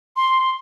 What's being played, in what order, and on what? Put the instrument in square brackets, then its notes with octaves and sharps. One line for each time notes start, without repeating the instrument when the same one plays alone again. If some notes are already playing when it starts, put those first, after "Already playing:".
[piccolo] C6